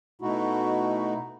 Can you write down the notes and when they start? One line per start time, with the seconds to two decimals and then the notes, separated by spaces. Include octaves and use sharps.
0.22 B2 A3 D#4 E4 F#4